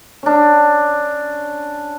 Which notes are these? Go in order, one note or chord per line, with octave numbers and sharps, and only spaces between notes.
C#4 D4